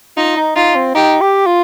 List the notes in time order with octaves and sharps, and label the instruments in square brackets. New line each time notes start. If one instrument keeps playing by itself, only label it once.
[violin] D#4 [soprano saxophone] F4
[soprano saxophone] D#4
[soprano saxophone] D#4 [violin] F4
[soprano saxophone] C4
[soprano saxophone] D#4 [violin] G4
[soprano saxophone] G4
F4